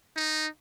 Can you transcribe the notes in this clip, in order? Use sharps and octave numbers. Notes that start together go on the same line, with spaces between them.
D#4